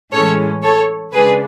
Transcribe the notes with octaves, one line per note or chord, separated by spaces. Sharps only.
A2 E3 G#3 C#4 A4 C#5
A4 C#5
C#3 G#3 D4 G#4 B4